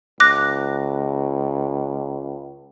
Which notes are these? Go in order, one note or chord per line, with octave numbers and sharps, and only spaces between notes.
C#2 D6 F#6 A#6